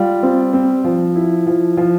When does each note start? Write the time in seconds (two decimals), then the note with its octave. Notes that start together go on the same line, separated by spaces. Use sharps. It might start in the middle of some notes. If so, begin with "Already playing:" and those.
Already playing: G3 F4
0.23 C4
0.53 C4
0.84 F3
1.16 E4
1.47 F3
1.77 F3